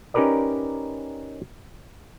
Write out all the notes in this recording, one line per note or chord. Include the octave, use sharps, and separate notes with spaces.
C#4 D#4 G4 A#4 B4 D5